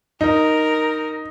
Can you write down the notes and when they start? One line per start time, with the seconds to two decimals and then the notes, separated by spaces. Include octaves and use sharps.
0.21 D#4 A#4